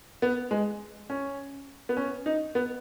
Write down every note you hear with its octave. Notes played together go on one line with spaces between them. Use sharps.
B3
G#3
C#4
B3
C#4
D#4
B3